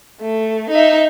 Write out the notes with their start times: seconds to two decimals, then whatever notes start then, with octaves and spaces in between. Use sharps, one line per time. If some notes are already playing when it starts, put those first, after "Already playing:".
0.21 A3
0.70 D#4 E5